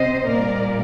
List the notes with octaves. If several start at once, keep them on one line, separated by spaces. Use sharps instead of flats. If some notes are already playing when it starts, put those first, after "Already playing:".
Already playing: C3 C4 C5 D#5
A#2 G3 A#3 A#4 D5